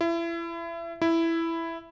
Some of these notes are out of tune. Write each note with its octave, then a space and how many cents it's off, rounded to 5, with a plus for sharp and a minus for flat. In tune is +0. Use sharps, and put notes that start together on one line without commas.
E4 +30
E4 +5